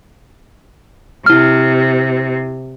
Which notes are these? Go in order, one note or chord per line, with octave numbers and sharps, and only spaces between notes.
C3 E4 F6